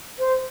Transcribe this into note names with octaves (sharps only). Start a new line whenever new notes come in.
C5